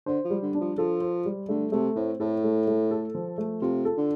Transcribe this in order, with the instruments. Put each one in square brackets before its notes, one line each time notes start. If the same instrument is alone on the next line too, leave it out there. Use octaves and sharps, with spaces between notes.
[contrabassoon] D3 [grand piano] C5
[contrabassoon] F3
[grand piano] G3
[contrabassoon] D3
[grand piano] D4
[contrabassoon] F3
[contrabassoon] F3 [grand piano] A4
[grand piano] C5
G3
[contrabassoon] D3 [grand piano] A3
[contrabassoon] C3 [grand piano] A3
[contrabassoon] A2 [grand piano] C4
[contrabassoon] A2 [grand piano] A4
[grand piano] A3
A3
A4
F3
A3
[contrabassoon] C3 [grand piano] F4
[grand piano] A4
[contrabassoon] D3